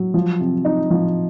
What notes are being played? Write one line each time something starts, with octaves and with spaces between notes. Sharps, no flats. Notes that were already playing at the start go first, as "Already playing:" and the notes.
Already playing: F#3
F3
C3
D#4
F3